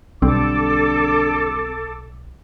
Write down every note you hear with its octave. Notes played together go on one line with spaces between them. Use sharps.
B1 D3 G3 C4 A4 D6